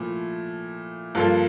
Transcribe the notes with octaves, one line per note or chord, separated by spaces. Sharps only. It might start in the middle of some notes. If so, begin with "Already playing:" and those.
Already playing: A#2 F3 A3 E4
G2 F3 A#3 F4 A4